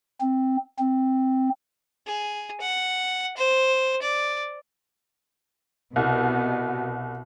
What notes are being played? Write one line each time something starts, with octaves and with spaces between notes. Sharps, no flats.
C4
C4
G#4
F#5
C5
D5
C2 B2